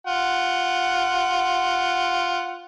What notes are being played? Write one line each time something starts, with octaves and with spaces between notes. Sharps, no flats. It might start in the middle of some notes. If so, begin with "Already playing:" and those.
F4 F#5